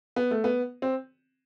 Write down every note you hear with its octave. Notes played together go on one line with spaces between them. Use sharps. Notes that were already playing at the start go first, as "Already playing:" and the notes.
B3
A3
B3
C4